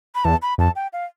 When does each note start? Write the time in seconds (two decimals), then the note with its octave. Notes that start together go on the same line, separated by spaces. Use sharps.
0.15 B5
0.24 E2 A5
0.42 B5
0.58 F2 A5
0.75 G5
0.93 F5